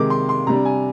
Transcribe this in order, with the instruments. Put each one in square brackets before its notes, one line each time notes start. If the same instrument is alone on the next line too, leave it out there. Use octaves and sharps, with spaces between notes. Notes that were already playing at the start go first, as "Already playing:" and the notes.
Already playing: [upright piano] C3 D#3 G#3 D6
C6
C6
C3 G3 D4 A#5
G#5